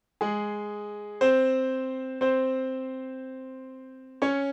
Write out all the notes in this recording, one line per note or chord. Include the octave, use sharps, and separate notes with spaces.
G#3 G#4
C4 C5
C4 C5
C#4 C#5